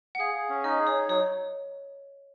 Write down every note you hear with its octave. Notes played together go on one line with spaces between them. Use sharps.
F#5
G#4 F5
G#4
C#4
D#4 D#5
G#4
C#5
D#4
F#3 C#5